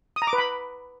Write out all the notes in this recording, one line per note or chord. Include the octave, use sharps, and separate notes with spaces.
D#6
A#5
D6
B4
B5